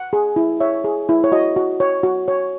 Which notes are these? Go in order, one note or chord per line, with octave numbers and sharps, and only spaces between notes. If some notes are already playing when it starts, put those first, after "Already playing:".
Already playing: F#5
G#4
E4
C#5 E5
G#4
E4
C#5
F#4 D#5
F#4
C#5
F#4
C#5